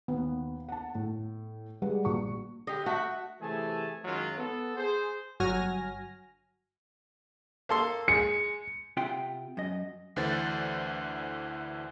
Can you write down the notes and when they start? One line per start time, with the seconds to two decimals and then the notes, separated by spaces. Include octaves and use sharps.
0.08 D#2 B3
0.69 F#5 A5
0.95 A2
1.82 G3 G#3 B4 F#5
2.05 A#1 F#4 C#6
2.67 D3 G4 D#5
2.86 A3 F#4 E5 F#5
3.42 C3 E3 A3 G#4 G#5 A5
4.05 F#2 D#3 F#3 G#3 F4
4.38 B3 A4
4.77 G#4 C5
5.40 G1 F#3 F#4 G#5 F6 A#6
7.69 A#3 A4 C6
8.08 G#3 C#7
8.97 C3 F4 E5 F#5 G5 C6
9.57 F#2 D#5
10.16 D2 D3 E3 C5 A6